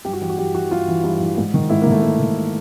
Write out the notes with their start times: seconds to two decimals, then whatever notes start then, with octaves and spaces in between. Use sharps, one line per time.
0.05 G2 G4
0.13 F#4
0.22 E3 G4
0.30 F#4
0.38 G2 G4
0.54 E3 F#4
0.71 G2 F4
0.88 E3
1.04 G2
1.20 E3
1.38 G#2
1.54 D#3
1.70 G#2 E4
1.82 A#3
1.87 D#3 A3
2.03 G#2
2.20 D#3